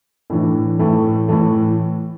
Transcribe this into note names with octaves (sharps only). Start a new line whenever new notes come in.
A2 E3 D4
A2 E3 A3
A2 E3 A3